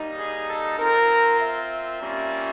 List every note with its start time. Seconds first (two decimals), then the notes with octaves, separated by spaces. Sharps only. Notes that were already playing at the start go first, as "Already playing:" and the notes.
Already playing: G3 A#3 D#4
0.18 G#4
0.49 A4
0.79 C4 F4 A#4
1.40 E5
2.01 G3 A#3 C#4 F4